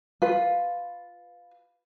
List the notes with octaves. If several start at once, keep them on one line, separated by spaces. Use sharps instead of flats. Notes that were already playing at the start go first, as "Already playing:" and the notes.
F4 B4